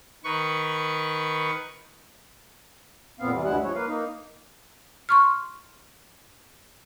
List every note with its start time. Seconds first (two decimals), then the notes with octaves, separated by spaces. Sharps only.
0.24 D#3 B4 C#6
3.20 F2 A#2 B3 C4 F5
3.32 C3 E3 G3
3.45 D2 G2 G3 G#3 E4 F#5
3.63 F3 C#5
3.75 A#3 B4 F5
3.87 A#3 D#4
5.09 C6 C#6 F6